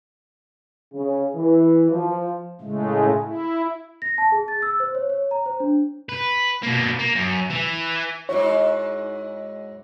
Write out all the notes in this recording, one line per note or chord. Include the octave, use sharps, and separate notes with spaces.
C#3
E3
F3
A2 C#3 G#3 A3
E4
A#6
A5
G#4
A6
E6
C5
C#5
C#5
A#5
C5
D4
B4
B2 A#3
A#3
F#2
E3
G#2 E4 F#4 C#5